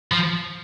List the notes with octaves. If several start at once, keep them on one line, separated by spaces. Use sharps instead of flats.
F3